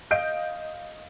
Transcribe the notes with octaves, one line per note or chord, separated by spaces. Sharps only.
D#5 F5 G6 D7